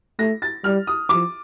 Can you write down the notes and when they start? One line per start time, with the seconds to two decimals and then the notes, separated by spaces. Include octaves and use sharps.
0.19 A3 A#6
0.42 A6
0.64 G3 F6
0.87 D#6
1.09 F3 D6